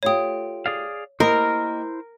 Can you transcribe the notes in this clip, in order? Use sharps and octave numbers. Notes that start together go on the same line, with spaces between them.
A3 F4 G4 C#5 D#6
G#4 D5 F5
A#3 E4 G4 A#4 C5 D#5